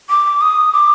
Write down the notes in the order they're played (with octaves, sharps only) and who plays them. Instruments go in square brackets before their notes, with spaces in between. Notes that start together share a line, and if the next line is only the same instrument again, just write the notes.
[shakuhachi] D6
D#6
D6